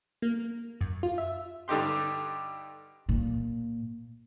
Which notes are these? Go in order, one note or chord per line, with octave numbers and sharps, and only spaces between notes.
A#3
F#2
F4
E5
G2 D3 D#4 G4 C6
A#2